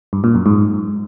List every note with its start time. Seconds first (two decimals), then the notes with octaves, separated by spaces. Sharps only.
0.13 G2
0.24 A#2
0.35 F#2
0.46 G#2